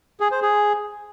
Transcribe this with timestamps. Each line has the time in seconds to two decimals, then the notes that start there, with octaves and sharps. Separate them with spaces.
0.20 G#4
0.31 C5
0.42 G#4